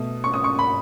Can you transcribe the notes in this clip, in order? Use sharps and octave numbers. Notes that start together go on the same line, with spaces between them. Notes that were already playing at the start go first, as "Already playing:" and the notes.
Already playing: B2 A3
C#6
D#6
C#6
B5